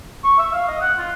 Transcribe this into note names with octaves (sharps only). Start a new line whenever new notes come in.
C#6
E5
F5
D#5
F#5
F4